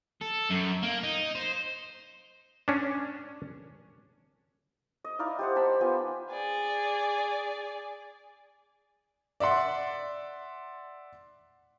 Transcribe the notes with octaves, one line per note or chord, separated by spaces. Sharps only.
A4
F#2
A#3
D#4
C5
C#4 D4
D#5
D#4 E4 D5 F5
G4 C5 F#5
G4 A5 B5 C6
B3 F4 G#5 B5
G#4 D5
D5 E5 F#5 C6